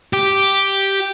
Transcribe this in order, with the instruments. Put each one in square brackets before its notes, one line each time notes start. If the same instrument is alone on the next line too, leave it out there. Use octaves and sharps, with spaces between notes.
[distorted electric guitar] G4